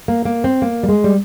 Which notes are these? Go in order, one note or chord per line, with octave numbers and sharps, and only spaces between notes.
A#3
A#3
C4
A#3
G3
G#3
G3